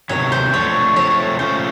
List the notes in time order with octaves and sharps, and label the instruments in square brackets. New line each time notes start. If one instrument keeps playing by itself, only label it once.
[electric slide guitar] C3 D#3 F#3 B3 [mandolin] C#5
[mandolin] C5
[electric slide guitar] F3 A3 D4 [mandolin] C#5
[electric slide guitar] F3 A3 C4 [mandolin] C#5
[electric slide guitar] A3 C#4 F4 [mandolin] C5